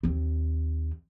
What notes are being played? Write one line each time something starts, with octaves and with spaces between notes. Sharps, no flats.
D#2 C4